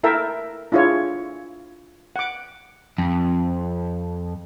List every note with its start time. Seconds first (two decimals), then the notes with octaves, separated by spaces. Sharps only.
0.04 E4 A4 A#4 E5 G5 A5
0.72 D4 E4 F4 G#4 C#5
2.16 F#5 D6
2.98 F2